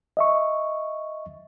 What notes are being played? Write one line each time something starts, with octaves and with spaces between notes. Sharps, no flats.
D#5 E5 C#6